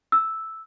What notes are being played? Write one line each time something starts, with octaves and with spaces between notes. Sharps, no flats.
E6